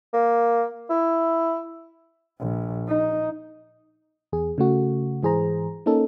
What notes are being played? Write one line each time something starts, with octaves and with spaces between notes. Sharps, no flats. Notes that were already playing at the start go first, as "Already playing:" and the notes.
A#3
E4
A#1
D#4
E2 G#4
C#3 A3 F#4
G#2 E3 G#4 C5 A#5
A#3 C#4 D#4 A4